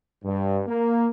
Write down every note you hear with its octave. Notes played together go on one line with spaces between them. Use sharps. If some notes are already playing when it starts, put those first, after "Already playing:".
G2
A#3